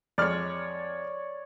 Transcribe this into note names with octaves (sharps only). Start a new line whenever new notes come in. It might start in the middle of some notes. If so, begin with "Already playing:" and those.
F2 G#3 C#5 D5 F6